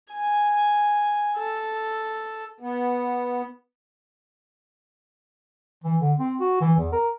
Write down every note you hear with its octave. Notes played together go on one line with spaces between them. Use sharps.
G#5
A4
B3
E3
D3
C4
F#4
E3
E2
A#4